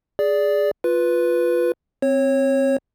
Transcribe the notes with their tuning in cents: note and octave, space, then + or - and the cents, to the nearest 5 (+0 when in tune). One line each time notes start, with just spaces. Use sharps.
G#4 +0 D5 -10
F4 +5 B4 +0
C4 +0 C#5 -20